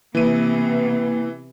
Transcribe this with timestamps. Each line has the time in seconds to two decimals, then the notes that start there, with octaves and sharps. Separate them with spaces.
0.15 C3 E3 A#3 B3 D#7